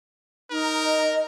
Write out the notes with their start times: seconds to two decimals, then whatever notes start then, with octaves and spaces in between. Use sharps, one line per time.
0.51 D#4 A#4
0.83 D#5